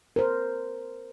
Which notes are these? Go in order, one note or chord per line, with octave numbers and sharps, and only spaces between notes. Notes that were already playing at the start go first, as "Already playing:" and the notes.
A#4 C5